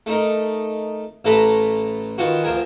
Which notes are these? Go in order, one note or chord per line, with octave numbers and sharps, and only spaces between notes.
A3 D#4 A#4
A1 E3 A3 A4 A#5 B5
D#3 E3 F4 F#4
D2 F3 A#4 G#5